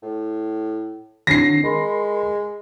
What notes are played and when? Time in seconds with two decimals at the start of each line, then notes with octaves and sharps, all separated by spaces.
0.02 A2
1.27 D#3 F#3 C4 D4 A#6 C7
1.64 G#3 A#4 B5 C6